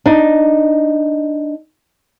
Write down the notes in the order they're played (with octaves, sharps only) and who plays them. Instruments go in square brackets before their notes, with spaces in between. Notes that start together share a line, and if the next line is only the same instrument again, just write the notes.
[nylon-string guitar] D4 D#4